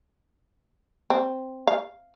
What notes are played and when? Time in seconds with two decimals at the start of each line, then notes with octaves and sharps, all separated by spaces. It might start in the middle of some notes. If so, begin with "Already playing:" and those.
1.10 C4
1.67 F5